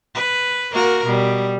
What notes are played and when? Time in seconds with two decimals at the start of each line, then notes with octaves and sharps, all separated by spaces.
0.15 B4
0.72 A#3 F#4 A#4
1.06 B2 G3